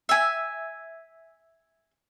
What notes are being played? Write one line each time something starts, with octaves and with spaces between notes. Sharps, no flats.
E5 G#5